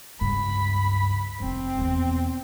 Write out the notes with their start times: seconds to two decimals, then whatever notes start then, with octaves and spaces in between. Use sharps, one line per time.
0.21 C#2 G2 B5
1.40 F1 F2 C4
1.78 E2 B2